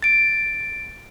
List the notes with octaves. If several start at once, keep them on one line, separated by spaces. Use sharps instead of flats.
A6 D7